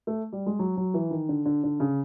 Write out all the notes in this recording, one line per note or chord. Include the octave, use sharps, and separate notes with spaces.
A3
G3
G#3
F#3
F#3
E3
D#3
D3
D3
D3
C#3